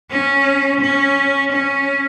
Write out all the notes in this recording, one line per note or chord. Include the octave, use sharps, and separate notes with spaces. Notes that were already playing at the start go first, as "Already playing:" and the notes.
C#4
C#4
C#4